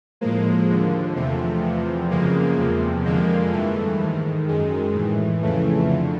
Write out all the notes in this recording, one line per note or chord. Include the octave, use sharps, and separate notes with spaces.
A2 F3 G#3 A#3
D#2 D3 F3
E2 C3 F3 A3
E2 C3 F3
F#2 C#3 F3 G#3 A#3
E2 C3 F3
F2 D3 F3 G#3 A#3
G2 E3 A3
G#2 D#3
F#2 D#3 G#3
A2 E3
F2 C#3 E3 A3
F2 D3